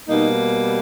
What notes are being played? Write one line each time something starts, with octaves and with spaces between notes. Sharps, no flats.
B2 G3 A#3 D#4